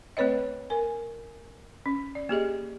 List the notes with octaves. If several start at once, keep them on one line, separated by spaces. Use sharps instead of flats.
A3 C4 B4 C#5 D#5
A#4 G#5
C#4
D5
A#3 G4 G#4 D#5